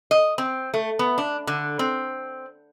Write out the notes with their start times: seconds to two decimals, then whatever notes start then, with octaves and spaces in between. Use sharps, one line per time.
0.11 D#5
0.38 C4
0.74 A3
0.99 B3
1.18 D4
1.47 D3
1.79 C4